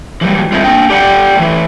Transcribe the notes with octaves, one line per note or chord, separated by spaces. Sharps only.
E3 F#3 G3
G#3 C4 E4 F4
A#3 D4 G5
G4 D5 F#5 G5
A2 E3 E4